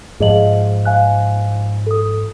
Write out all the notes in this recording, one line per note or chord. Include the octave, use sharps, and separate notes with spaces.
G#2 F3 G#4 D#5 F#7
F5 G#5 F#6
A4 D#6